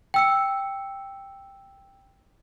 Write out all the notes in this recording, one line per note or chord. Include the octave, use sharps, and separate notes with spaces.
G5 E6 C#7